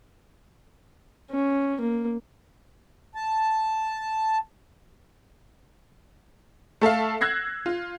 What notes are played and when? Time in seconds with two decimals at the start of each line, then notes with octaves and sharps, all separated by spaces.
1.31 C#4
1.80 A#3
3.15 A5
6.81 A3 A4 E5 F5
7.21 E6 F#6 G#6 A#6 C7
7.66 F4